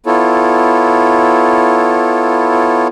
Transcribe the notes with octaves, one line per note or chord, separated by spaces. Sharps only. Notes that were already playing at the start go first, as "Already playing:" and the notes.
B3 E4 F4 A4 C#5